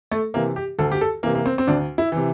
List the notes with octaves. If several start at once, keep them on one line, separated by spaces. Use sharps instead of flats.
A3
C3 E3 A#3
G4
D2 A4
G4
A4
C3 E3 A#3
A#3
C4
C4
D2 D4
E4
C3 E3